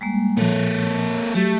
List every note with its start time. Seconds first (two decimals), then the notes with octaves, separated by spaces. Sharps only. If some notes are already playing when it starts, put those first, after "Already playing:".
0.01 G3 G#3 A#3
0.37 A#2 F3 A#3 A4 C#5
1.35 F#3 A3 G4